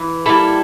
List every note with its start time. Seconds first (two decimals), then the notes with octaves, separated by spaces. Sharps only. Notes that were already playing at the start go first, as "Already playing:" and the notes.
Already playing: E3
0.26 G3 A#3 E4 A4